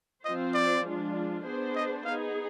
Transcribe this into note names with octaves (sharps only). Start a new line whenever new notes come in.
F3 C4 F4 C5 D#5
D5
F3 G#3 D4 F4
B3 D4 G#4 C5
D#5
B3 D#4 G#4 F5